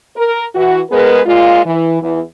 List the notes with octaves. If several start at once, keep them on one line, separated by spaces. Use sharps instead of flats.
A#4
E3 F#4
G#3 B3 G#4 A#4 B4
A#2 G#3 F4
E3
E2 E3